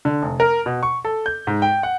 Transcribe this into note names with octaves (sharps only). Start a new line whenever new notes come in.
D3
F1
A#4
B2
C#6
A4
G6
G#2
G5
F#5